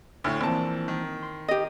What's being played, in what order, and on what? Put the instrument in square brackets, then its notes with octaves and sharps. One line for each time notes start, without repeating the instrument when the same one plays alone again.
[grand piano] D2 A2
[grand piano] A#1 A5 [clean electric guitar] E3 A#3 C4
[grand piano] D#3
[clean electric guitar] C6
[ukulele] G4 D#5